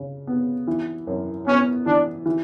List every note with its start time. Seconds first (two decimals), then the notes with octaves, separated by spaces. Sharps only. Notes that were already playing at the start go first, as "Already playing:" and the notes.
Already playing: C#3
0.27 B3
0.68 E3
1.07 F#2
1.47 B3 C#4
1.86 E3 D4
2.26 E3